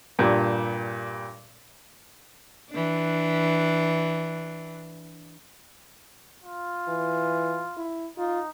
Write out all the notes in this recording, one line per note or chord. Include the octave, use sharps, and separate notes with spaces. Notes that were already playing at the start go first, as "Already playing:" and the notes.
G2 A#2 G3
E3 D4
F4
E3
E4
D#4 F4